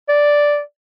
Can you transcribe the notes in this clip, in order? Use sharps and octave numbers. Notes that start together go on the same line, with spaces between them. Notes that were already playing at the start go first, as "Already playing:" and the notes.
D5